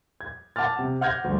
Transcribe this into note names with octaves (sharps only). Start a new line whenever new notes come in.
G#6
F#5 A5 D6 F6 A6
C3
F#5 F6 G6 G#6 A#6
D2 G2